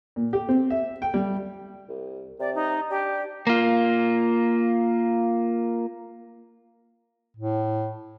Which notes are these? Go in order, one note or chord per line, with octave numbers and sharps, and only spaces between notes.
A#2
G4
C4
E5
G5
G3
C2
C3 D5
D#4
D4 G4
A#3 F4
A2